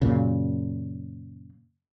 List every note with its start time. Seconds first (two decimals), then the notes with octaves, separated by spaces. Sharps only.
0.02 F#2 A#2 C#3